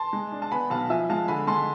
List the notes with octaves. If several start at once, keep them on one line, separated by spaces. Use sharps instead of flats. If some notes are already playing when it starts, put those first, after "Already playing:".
Already playing: A5 C6
G#3
D4
A5
B3 G#5 B5
B1 F5 A5
F3 E5 G#5
G#3 F5 A5
D3 G#5 B5
G#3 A5 C6